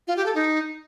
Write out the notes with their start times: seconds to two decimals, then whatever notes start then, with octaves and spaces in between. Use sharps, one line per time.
0.08 F4
0.17 G4
0.26 A4
0.35 D#4